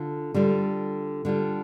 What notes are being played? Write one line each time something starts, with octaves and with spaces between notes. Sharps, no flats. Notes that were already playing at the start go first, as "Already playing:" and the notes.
Already playing: D3 F4
D3 G3 F4
D3 G3 F4